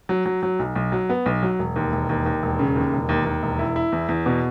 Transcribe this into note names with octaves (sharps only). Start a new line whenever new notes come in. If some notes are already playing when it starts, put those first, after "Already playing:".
F#3
F#3
F#3
B1
B1
F#3
B3
B1
F#3
E1
D#2
E1
D#2
D#2
E1
C#3
D#2
E1
D#2
D#2
E1
E4
E4
E2
E2
B2